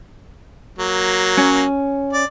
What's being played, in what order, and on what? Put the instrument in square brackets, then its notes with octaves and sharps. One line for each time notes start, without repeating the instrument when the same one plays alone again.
[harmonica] F#3 A#3
[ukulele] C#4
[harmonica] D5